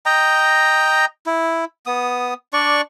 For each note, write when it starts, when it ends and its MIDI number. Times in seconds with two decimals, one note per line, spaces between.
0.06 1.05 75
0.06 1.05 79
0.06 1.05 82
1.26 1.65 64
1.86 2.34 59
1.86 2.34 87
2.53 2.81 62
2.53 2.81 74
2.53 2.81 85